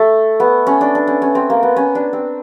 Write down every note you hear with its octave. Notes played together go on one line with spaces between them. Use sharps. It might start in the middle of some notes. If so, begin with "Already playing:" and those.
Already playing: A3
B3
C#4
D4
D4
C#4
C#4
C4
A#3
B3
C#4
D4
C4